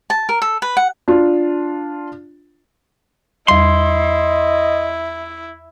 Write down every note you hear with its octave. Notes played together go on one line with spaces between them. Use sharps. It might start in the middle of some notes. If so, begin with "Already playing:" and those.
A5
A#4
A4
B4
F#5
D4 F4
E2 G3 E4 D#5 C6